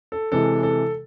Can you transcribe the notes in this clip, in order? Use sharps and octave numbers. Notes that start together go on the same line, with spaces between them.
A4
C3 E3 G#3 A4
A4